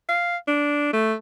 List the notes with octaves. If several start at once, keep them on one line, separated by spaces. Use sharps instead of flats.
F5
D4
A3